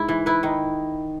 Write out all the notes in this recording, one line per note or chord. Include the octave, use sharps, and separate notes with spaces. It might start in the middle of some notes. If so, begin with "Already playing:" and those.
Already playing: G#2 E4
E3
E4 B4
D#3